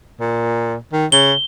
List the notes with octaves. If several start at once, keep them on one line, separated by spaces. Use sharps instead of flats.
A#2
D#3
C#3 G7